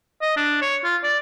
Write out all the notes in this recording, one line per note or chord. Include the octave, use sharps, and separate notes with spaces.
D#5
D4
C#5
F4
D5